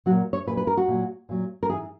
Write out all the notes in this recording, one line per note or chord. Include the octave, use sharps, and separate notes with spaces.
A#2 F#3 F#4
C#5
A#2 F#3 B4
B4
A#4
F#4
A#2 F#3
A#2 F#3
A#4
G#2 E3 G#4